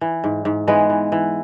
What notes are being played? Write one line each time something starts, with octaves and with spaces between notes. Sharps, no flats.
E3
G#2
G#2
E3 G#3 B3
E3
E3